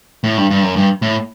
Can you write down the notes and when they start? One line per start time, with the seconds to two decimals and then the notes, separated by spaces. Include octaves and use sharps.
0.24 A2
0.38 G2
0.50 G2
0.63 F#2
0.76 G2
1.02 A2